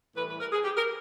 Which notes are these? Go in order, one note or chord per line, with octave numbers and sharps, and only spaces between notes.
A2 E3 G3 B4
B4
A#4
G#4
G4
A#4